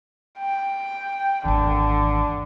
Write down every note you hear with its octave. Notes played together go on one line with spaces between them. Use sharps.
G5
G#1 E2 D3